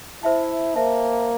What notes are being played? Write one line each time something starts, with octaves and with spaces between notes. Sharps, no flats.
E4 C5 E5 A5
A#3 C5 E5 A5